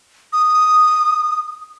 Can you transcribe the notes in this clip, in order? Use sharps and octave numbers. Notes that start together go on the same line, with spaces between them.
D#6